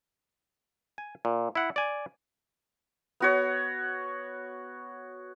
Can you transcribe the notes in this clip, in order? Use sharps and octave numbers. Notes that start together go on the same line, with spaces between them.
G#5
A#2
E4 F#5
D5 G#5
B3 F#4 C#5